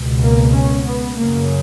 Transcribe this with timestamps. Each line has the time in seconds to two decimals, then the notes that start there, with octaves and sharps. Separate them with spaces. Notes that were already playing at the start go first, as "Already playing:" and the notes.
Already playing: C#2 B2
0.20 A#3
0.53 C#4
0.84 B3
1.16 F#2 C#3 A#3